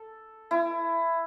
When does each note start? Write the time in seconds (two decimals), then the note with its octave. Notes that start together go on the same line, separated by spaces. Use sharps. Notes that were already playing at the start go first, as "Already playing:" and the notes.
Already playing: A4
0.51 E4